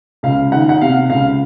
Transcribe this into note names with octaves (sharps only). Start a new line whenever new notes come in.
C#2 F5
D#3 F#5
F#5
C3 F5
C#2 F5